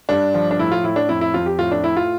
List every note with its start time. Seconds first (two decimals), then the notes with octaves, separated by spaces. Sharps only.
0.09 G2 D4
0.34 F3
0.51 D4
0.58 A2 E4
0.72 F4
0.84 A2 E4
0.96 D4
1.09 F2 E4
1.21 E4
1.34 F2 F4
1.46 G4
1.58 A2 F4
1.71 D4
1.84 A2 E4
1.97 F4